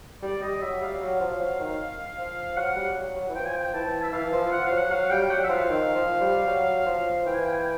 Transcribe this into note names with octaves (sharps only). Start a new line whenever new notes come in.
G3 D5
G3 D#5
F#3 E5
G3 F5
F#3
F3
F#3
D#3
F3
F#3 F#5
G3
F#3
F#3
E3
F3 G5
G#5
G5
E3 A5
E5
E3 F5
F3
F3 F#5
F5
F#3
F#5
F#3 F5
G3 G5
F#3 F#5
E5
F3 F5
D#3
F3
G3
F#3
F3
E3 G5
G#5
G5
G#5
G5